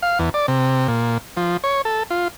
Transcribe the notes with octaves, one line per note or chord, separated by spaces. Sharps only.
F5
E2
D5
C3
A#2
F3
C#5
A4
F4